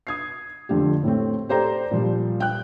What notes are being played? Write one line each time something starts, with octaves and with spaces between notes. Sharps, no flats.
D#6 G#6 C7
F2 D3 A3 G4
A2 A3 C4
G4 A4 C5 D5 G5 A#5
A#2 F3 G3
G5 F#6